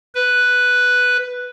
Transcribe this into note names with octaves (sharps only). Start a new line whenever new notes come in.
B4